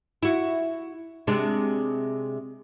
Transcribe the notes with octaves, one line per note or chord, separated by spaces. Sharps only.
E4 F#4
C3 G#3 D4